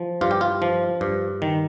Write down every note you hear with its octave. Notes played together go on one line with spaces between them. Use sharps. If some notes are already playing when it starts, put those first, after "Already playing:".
Already playing: F3
G2 F4
G4
F4
F3
G2
D#3